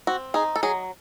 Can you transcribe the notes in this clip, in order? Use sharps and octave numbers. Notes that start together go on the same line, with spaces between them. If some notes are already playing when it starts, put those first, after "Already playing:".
C4 F#4
D#4 G#4
A4
F#3 G#4